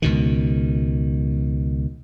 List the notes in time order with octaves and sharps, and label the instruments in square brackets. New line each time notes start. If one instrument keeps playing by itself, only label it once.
[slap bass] C#2 B2 D#3